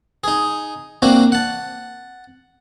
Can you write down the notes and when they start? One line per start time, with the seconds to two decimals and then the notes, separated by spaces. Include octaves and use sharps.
0.24 D#4 G#4
1.02 A#3 C4 D4 F#4
1.32 F#5 A5